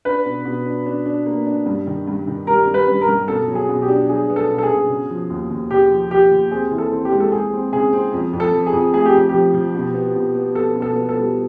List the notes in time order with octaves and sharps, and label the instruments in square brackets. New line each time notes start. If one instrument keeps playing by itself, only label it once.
[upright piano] D4 [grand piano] B4
[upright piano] B2
B2
D4
D4
D4
A#3
D4
G2
D#3
G2
D#3
[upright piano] G3 [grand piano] A#4
[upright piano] G3
[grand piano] B4
[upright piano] G2
[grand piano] A#4
[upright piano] G2
[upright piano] B2 [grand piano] A4
[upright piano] F#3
[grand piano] G#4
[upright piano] B2
[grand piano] G4
[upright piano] D4
[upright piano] F#3 [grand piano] G#4
[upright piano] B3
[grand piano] A4
[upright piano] B2
[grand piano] A4
G#4
[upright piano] B2
C#3
F3
D#2
D#2
[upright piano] C#3 [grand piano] G4
[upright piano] F3
[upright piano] F3 [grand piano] G4
[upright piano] D#2
[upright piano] C4 [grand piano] G#4
[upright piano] E3
[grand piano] A4
[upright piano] C4
[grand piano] G4
[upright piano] G#3
[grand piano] A4
[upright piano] G#3 [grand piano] G#4
[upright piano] C4
[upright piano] C#3 [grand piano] G#4
[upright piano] C4
F2
F2
[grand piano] A4
[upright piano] F3
[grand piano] G#4
[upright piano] F2
[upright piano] A3 [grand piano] G#4
[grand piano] G4
[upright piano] F2
[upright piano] F3 [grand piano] G4
[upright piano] F3
B2
B3
B2
B3
[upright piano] B3 [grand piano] A4
[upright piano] B2
[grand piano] A4
[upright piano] B3
[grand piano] A4
[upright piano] G3